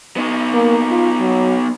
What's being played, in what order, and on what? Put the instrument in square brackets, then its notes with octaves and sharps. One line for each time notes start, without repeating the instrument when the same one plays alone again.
[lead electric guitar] B3 D#4
[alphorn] A#3
F4
F#3